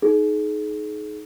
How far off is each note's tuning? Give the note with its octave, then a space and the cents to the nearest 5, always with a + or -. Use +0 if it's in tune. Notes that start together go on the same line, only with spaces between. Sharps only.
D#4 +0 G#4 +35